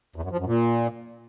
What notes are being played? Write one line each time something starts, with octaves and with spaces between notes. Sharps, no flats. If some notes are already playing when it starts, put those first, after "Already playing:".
E2
F#2
F3
F#2
A#2